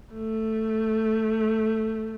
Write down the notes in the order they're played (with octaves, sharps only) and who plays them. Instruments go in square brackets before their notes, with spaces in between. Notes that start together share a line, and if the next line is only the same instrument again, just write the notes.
[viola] A3